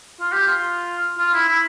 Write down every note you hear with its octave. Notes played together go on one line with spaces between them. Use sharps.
F4
G4
F4
F4
E4
E4